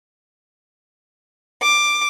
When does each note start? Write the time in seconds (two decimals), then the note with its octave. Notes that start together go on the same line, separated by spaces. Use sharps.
1.62 D6